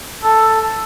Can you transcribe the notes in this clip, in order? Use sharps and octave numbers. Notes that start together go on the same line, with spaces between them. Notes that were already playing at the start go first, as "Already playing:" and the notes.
A4